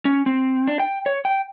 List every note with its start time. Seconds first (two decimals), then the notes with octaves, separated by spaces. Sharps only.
0.05 C#4
0.26 C4
0.67 D4
0.80 G5
1.06 C#5
1.25 G5